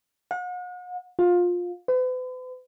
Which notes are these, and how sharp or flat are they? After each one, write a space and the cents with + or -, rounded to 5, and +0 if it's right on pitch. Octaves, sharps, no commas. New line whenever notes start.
F#5 -40
F4 +20
B4 +45